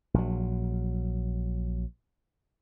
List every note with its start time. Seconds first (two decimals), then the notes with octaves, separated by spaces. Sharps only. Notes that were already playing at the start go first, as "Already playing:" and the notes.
0.14 A#1 F#3